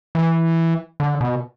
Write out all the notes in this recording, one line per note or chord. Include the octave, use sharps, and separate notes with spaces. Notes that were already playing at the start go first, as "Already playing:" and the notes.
E3
D3
B2